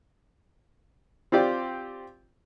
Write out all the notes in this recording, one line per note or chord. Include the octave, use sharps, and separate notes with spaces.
C4 F4 G4 D5